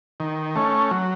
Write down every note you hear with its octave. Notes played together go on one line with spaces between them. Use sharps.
D#3
A3 C#4
F#3